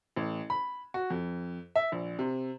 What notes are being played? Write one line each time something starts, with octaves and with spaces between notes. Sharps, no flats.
A1
B5
F#4
F2
E5
A#1
C3